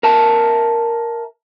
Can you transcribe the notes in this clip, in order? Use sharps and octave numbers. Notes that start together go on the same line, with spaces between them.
A#4 E5 A5